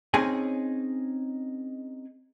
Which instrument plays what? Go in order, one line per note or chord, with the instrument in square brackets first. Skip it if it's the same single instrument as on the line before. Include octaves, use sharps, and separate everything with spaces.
[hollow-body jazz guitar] C4 C#4 D#4 G#4 G#5